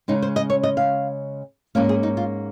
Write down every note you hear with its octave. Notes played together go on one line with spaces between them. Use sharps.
C#3 G#3 C#4 D#4
C5
D#5
C#5
D#5
F5
G#2 F#3 A#3 C#4 F5
G#4
D#4
F4